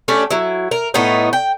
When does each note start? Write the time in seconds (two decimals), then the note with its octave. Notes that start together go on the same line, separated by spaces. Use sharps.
0.08 A3 C#4 D4 G4
0.31 F#3 E4
0.71 A#4
0.94 A2 A3 B3 D#4
1.33 G5